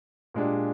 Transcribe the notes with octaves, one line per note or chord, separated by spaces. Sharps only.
A#2 G#3 D4 G4